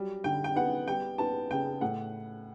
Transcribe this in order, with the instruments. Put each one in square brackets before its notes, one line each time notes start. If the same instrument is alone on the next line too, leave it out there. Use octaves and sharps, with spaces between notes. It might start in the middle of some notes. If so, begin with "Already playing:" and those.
Already playing: [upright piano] F#3 G3
D3 G5
G5
B3 F#5
G3 G5
B3 A5
C#3 G5
A2 F#5